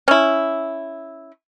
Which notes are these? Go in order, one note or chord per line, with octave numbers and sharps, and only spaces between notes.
C#4 E4